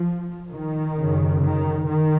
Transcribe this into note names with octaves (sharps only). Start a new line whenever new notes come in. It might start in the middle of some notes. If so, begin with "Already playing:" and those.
Already playing: F3
D#3
F#2 C#3
D#3
D#3